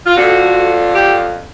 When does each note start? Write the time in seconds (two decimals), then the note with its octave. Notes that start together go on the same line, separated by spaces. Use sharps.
0.06 F4
0.15 F2 D3 F3 F#4
0.94 G4